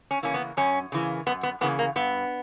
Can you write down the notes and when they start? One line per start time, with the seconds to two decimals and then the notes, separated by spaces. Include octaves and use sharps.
0.11 C#4
0.23 C#3 E3 A#3 C#4
0.34 B3
0.57 F#2 C#4
0.92 C#3 E3 A#3
1.26 F#2 B3
1.43 B3
1.61 C#3 E3 A#3 B3
1.79 A#3
1.96 G2 B3